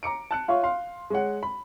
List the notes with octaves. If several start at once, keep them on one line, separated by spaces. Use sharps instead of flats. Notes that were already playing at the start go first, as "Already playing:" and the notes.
A#5 D6 C#7 D7
A5 F#6 C#7
F4 C#5 E5 F5 C#6
F5 C6
G#3 C#5 F#5
B5